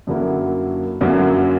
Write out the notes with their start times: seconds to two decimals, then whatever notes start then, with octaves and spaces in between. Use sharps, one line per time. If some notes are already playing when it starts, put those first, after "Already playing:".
0.07 F#2 D3 F#3 A#3 E4
1.01 F#2 D3 F#3 A#3 E4